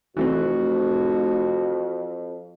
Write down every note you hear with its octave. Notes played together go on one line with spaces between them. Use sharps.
F1 F2 E3 A3 C4 F#4